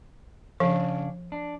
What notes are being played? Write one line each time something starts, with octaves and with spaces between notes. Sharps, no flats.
C#3 F3 D4 F5
D4